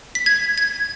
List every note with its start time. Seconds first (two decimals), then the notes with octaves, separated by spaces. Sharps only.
0.15 B6
0.26 G#6
0.58 G#6